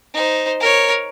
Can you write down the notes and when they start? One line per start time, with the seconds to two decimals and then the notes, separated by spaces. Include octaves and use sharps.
0.14 D#4 C5
0.60 A#4 C#5